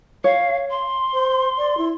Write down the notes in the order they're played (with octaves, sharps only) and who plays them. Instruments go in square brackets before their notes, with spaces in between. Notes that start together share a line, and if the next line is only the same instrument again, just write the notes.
[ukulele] C#5 [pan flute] F5
[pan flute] C6
[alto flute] C5
D5
E4